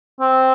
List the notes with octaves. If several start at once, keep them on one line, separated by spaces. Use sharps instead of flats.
C4